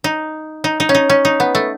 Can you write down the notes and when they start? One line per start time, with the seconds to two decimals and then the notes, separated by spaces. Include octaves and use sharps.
0.04 D#4
0.64 D#4
0.80 D#4
0.89 C#4
0.95 D#4
1.10 C#4
1.25 D#4
1.40 B3
1.55 A3